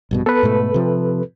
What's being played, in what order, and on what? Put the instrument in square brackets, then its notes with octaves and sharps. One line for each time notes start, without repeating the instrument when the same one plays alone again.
[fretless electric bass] A#1 G2 B2
[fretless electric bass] B3 [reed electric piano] A4 B4
[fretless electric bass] G#2 B2 A3
C3 F3